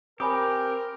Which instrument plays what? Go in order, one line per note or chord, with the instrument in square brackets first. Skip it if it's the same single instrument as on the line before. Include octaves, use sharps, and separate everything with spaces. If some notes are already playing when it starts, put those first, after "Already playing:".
[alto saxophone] C4 [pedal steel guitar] G4 [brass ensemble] A#4 [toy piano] G#5 B5 D#6